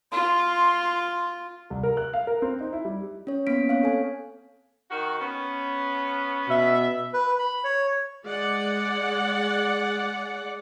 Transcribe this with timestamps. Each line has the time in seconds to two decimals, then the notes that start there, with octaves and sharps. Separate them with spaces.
0.12 F4 C6
1.70 C2
1.83 A#4
1.97 F#6
2.13 F5
2.27 A#4
2.42 C4
2.60 D#4
2.73 E4
2.85 G3
3.27 C#4 C#5
3.47 A#3 B3 C#4 B6 D7
3.69 C4 C#5 F5
3.83 A4 G#5
4.90 D#3 F#4
5.20 B3 C#4
6.49 B2 E5
7.14 B4
7.39 B5
7.64 C#5
8.24 G#3 D5 F#5